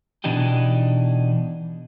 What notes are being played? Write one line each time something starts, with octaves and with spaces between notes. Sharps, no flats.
B2 E3 D4 D#4 G4